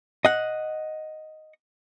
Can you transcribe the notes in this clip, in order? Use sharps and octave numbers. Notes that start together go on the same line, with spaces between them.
D#5 F#5